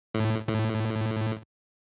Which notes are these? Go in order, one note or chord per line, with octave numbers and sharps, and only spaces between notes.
A2
A2